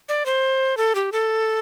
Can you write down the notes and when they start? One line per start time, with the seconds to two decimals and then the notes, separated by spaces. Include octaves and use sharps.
0.09 D5
0.26 C5
0.77 A4
0.95 G4
1.12 A4